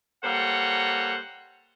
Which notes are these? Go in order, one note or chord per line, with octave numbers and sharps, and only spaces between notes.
G3 A#3 A4 C5 C#5 F#5